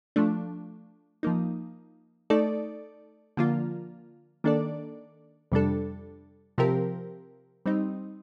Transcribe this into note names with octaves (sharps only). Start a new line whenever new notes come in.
F3 A3 D4
F3 A#3 D#4
A3 D#4 A4 D5
D3 F3 A#3 F4
D#3 A#3 D4 A4 D5
F2 C3 G3 D4 A4
C3 F3 C4 G4 A#4
G3 C4 D#4